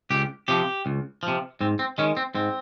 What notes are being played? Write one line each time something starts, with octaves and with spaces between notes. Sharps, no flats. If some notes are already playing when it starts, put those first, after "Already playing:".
C#2 G4
C3 F3 G4
C#2
F3
C3
G#2 C4
C4
D#3 G#3 C#4
C4
G#2 C4